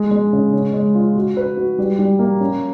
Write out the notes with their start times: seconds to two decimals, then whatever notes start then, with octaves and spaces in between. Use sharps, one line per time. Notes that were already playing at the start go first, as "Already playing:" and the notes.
Already playing: G#3
0.11 G#3
0.33 C#3
0.53 C#4
0.73 G#3
0.95 F4
1.16 F#4
1.37 B4
1.57 F#4
1.78 G3
1.99 G3
2.19 A#3
2.40 C#4